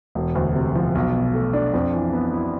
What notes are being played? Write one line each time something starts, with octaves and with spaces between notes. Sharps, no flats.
E1
D2
C3
F3
B1
B2
A3
D4
F2
E3
B3
E4